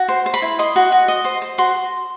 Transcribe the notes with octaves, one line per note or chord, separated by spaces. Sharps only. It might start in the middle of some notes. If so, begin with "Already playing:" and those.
Already playing: F#4
C5
C5
B5
E4
D#5 C6
F#4
F#4
D#5
C5
C5
F#4 C6